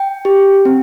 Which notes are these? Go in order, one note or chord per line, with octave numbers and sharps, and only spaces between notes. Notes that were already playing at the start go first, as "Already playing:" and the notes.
Already playing: G5
G4
C4